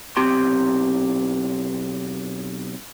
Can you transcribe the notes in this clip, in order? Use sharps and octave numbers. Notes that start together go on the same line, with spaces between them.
B1 C4 G4 C6